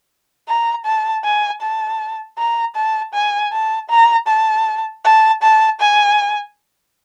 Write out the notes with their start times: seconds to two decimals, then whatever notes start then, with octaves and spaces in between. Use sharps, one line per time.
0.48 A#5
0.85 A5
1.24 G#5
1.62 A5
2.38 A#5
2.76 A5
3.14 G#5
3.52 A5
3.89 A#5
4.27 A5
5.05 A5
5.43 A5
5.80 G#5